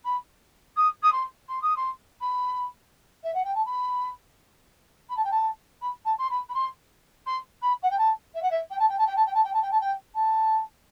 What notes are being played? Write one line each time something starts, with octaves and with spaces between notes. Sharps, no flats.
B5
D#6
D#6
C6
C6
D#6
C6
B5
E5
F#5
G5
A5
B5
B5
A5
G5
A5
B5
A5
C6
B5
B5
C6
C6
B5
F#5
G5
A5
E5
F#5
E5
G5
A5
G5
A5
G5
A5
G5
A5
G5
A5
G5
A5
G5
A5